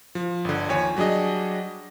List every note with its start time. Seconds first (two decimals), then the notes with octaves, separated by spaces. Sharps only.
0.15 F3
0.45 G1 D3
0.69 D#2 F3 C#5 G#5
0.97 F#3 G3 D4 G#4 D#5